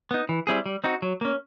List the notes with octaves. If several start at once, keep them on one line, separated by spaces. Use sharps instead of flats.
B3 D#4
E3
G3 C4 E4 G#4
G3
C4 D#4 F#4
F#3
A#3 C#4